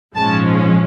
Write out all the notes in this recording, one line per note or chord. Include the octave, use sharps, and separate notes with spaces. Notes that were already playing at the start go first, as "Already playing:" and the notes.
A#1 G#2 F3 G#3 C#4 A5